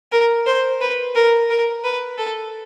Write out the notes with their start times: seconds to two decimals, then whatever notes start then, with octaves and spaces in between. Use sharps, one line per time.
0.12 A#4
0.46 C5
0.81 B4
1.15 A#4
1.50 A#4
1.84 B4
2.18 A4